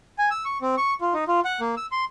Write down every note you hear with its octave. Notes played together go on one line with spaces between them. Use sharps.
G#5
E6
C#6
C4
C#6
F4
D#4
F4
F#5
A#3
E6
C6